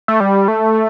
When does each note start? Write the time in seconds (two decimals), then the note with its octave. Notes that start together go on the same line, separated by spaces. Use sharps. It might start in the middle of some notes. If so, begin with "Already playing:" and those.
0.08 A3
0.20 G3
0.48 A3